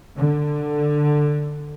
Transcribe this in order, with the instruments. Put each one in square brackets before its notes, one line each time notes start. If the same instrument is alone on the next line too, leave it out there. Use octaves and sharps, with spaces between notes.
[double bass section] D3